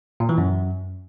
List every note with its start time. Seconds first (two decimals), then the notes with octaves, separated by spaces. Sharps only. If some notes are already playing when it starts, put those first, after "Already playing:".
0.20 A#2
0.29 E3
0.38 F#2